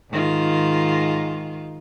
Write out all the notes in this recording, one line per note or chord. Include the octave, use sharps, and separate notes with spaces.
G#2 D#3 F4